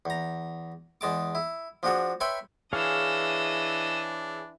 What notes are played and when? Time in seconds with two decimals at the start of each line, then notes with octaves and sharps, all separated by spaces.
0.05 E2 A#5
1.01 E2 G#3 A5 D6
1.35 E4
1.83 F3 D4 F#4 G#4
2.20 B4 C#5 E5 G5 B5 C6
2.73 E3 D4 G#4 C#5 D#5 F5 E6